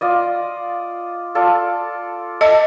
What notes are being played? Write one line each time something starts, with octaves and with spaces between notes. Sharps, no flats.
F4 D5 D#5
F4 A4 D5
A4 D#5 E5